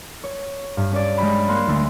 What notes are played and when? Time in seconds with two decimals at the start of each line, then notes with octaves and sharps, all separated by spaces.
0.24 C#5
0.77 G2
0.92 C#4 C#5 D5
1.18 G#3 G4 B5
1.48 A#3 C6 F#6
1.68 D2 A3